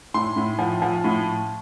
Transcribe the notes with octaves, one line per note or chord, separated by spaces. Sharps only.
A2 C6
A2
F3
F3
A2